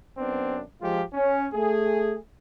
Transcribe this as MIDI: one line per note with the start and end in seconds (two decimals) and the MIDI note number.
0.18 0.61 42
0.18 0.61 59
0.18 0.61 60
0.18 0.61 62
0.81 1.01 53
0.81 1.01 56
0.81 1.01 65
0.81 1.01 67
1.13 1.45 61
1.54 2.16 57
1.54 2.16 68